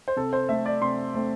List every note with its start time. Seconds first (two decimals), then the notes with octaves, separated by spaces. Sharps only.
0.08 C5
0.16 C3 A4
0.33 C5
0.49 A3 C4 E5
0.66 D5
0.81 C3 C6
1.14 A3 C4